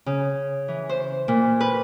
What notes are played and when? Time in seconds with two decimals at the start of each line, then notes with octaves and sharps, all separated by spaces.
0.06 C#3
0.68 E3
0.89 C5
1.28 A#2
1.61 B4